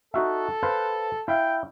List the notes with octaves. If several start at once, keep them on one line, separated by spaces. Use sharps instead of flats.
D#4 F#4 A4 E5
B4 C5 F5
E4 E5 F5 G5